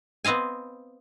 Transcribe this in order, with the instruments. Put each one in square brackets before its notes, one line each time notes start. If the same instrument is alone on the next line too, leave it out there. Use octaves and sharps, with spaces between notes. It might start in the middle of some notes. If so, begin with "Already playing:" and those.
[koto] B3 C4 D#5 F5 G#5